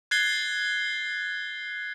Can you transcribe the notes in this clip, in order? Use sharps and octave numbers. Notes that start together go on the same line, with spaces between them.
F#6 G#6 A6 C7 G7